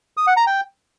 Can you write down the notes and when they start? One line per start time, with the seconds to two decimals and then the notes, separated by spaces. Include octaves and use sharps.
0.17 D#6
0.27 F#5
0.37 A#5
0.47 G5